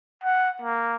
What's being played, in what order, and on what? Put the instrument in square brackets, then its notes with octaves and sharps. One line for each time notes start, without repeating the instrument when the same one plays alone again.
[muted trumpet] F#5
A#3